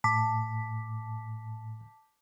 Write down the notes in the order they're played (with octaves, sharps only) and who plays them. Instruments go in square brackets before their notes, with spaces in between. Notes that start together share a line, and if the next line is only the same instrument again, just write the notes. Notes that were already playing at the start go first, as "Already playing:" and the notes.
[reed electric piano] A2 [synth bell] A5 D6 B6